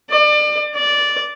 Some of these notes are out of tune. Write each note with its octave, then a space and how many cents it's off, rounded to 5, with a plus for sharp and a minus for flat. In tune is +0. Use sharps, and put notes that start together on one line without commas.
D5 +30
D5 -10